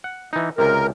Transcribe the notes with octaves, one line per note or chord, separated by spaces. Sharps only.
F#5
E3 D#4
C#2 C3 A#4